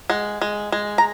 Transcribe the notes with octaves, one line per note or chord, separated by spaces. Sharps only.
G#3 F#5
G#3
G#3
A#5